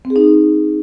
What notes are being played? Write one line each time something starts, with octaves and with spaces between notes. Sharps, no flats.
C4
G#4
D#4